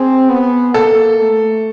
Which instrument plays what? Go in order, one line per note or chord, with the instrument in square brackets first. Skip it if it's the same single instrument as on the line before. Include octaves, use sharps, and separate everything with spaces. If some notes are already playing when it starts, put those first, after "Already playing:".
Already playing: [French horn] C4 [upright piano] G#4
[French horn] B3
[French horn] A#3 [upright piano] A4
[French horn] A3